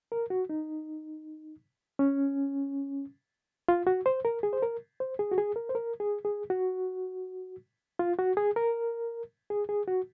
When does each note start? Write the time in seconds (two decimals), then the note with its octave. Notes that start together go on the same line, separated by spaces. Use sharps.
0.12 A#4
0.30 F#4
0.49 D#4
1.99 C#4
3.69 F4
3.87 F#4
4.06 C5
4.25 A#4
4.43 G#4
4.53 C5
4.62 A#4
5.00 C5
5.19 G#4
5.32 F#4
5.38 G#4
5.56 A#4
5.69 C5
5.75 A#4
6.00 G#4
6.25 G#4
6.50 F#4
7.99 F4
8.19 F#4
8.37 G#4
8.56 A#4
9.50 G#4
9.69 G#4
9.88 F#4